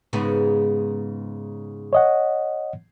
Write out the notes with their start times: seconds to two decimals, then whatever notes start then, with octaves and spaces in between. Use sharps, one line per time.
0.13 G#2 C#3 B3
1.93 C#5 D#5 F#5